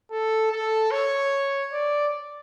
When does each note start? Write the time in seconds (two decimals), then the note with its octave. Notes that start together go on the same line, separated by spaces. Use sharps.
0.11 A4
0.52 A4
0.91 C#5
1.73 D5